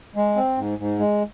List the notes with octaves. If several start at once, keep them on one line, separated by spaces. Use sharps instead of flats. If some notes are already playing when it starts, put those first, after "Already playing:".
G#3
C4
G#2
G#2
G#3